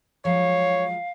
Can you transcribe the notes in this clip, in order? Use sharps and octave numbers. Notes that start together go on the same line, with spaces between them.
F3 F#3 G#3 C#5 F5